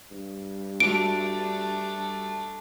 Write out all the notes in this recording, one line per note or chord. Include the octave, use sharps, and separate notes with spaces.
G2
G3 A3 D4 F#4 D7